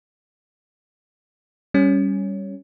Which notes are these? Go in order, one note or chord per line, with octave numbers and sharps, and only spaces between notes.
G3 C#4